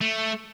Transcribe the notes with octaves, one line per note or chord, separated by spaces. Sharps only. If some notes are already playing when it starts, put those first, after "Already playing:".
A3